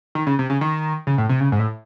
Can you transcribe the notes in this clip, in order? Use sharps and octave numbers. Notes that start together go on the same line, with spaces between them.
D#3
C#3
C3
C#3
D#3
C#3
A2
C3
C#3
G#2
A2